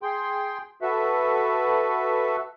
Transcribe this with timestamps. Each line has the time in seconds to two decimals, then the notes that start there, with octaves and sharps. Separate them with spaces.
0.02 G#4 G5 C6
0.82 F#4 A4 B4 E5